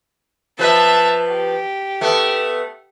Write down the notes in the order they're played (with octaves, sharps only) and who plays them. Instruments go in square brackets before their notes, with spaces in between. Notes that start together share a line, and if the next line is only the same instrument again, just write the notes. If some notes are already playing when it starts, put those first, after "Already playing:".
[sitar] F3 B4 [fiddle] E5 A5
[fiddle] G4
[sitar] A3 B3